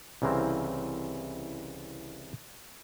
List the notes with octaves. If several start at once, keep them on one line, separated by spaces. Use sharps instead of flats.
C2 C#3 E3 C4 A#4 C5